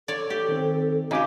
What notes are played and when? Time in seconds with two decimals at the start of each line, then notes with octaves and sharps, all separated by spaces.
0.08 A4 C#5 D5
0.30 G4
0.49 D#3 C4
1.11 C#3 D#4 F#4 G4 G#5 D6